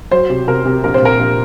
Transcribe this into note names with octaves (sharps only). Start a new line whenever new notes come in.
F#3 C5
C3
C3 A#4
C3
A#1 A#4
C5
A#2 A#4
A#1